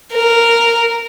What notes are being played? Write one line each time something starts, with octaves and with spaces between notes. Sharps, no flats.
A#4